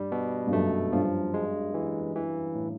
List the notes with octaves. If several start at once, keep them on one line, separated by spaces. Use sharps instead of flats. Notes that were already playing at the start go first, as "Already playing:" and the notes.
Already playing: G2 G3
B2
G2
F#2 A3
G2 F3
G#3
E3
E3
A2